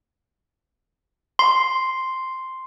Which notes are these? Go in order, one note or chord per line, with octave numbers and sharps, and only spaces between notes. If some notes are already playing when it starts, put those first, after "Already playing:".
C6